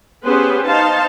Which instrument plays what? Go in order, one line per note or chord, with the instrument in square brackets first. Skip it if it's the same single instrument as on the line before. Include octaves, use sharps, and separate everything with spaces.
[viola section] B3 C#4 G4 G#4 B4 C5
D#4 C5 F5 A5